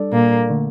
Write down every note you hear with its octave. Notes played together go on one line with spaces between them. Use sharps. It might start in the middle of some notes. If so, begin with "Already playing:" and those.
Already playing: G3 D4 A4 D5
A#2 A#3
D3 A3